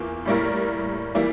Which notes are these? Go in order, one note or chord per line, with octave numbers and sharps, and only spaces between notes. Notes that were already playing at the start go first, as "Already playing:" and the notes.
Already playing: E2 E3 A#3 F4
A2 G3 A#3 E4 A#4
E3 G3 A#3 E4